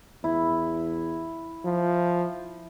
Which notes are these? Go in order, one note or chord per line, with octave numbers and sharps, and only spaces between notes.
E2 E4
F3